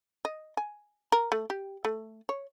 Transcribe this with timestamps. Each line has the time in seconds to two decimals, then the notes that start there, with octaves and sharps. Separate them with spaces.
0.25 D#5
0.57 G#5
1.12 A#4
1.32 A3
1.50 G4
1.85 A3
2.29 C#5